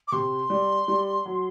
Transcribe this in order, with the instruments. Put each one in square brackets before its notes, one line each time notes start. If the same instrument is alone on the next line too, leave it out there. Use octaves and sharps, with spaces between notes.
[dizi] D6
[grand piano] C3 [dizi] C6
[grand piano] G3
G3
F#3